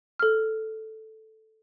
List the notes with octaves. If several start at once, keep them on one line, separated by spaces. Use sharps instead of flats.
A4 F6